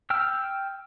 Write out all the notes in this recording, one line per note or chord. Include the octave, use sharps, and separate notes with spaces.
G5 E6 F6